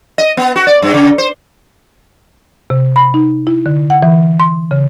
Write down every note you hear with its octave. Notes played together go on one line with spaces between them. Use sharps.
D#5
B3
F#4
D5
G2
C#3
C5
C3
B5
D#4
E4
D3
F#5
E3
C6
C#3